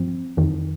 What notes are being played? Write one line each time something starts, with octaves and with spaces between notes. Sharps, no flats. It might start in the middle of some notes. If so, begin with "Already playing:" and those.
Already playing: G2 F3 C4
F2 D#3